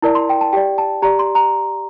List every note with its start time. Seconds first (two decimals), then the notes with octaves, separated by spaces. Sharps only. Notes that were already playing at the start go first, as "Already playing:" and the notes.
0.02 E4 A#4 D5 A5
0.15 C6
0.29 G5
0.41 A5
0.53 G4 D5 G5
0.78 A5
1.02 G4 D5 A#5
1.19 C6
1.35 A#5